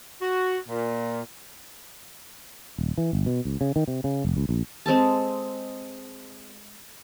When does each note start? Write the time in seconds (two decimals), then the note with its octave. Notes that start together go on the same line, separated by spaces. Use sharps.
0.21 F#4
0.67 A#2
2.78 D#1
2.98 E3
3.13 G1
3.26 B2
3.45 C#2
3.61 C#3
3.76 D#3
3.88 C3
4.04 C#3
4.24 F1
4.37 C#2
4.49 A#1
4.86 G#3 C4 A4 A5